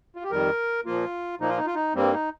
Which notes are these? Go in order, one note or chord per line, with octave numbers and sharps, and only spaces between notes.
F4
G4
F2 D#3 G3 A#4
A#2 F3 A#3 F4
A#2 F3 A#3 D#4
F4
D#4
F4
D#4
G2 G3 A#3 C4
D#4